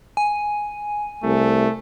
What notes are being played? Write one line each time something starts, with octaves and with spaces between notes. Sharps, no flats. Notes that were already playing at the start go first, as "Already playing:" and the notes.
G#5
C2 A3